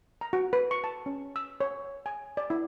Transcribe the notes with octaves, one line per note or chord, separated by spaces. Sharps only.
A#5
F#4
B4
C#6
A5
C#4
E6
C#5
G#5
D5
E4